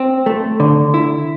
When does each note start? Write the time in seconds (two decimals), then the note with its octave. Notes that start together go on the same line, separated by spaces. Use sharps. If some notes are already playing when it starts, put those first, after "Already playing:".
Already playing: C4
0.26 A3
0.60 D3
0.94 E4